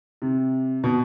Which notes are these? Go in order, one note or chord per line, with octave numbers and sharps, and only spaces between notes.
C3
B2